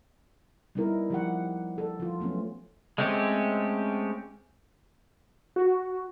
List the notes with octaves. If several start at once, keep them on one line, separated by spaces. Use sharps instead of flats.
G3 B3 D#4 E4 A#4
F3 G4 F#5
A4
F3 F4
F#3 A3 B3 C#4
G#3 A3 C4 C#4 G4
F#4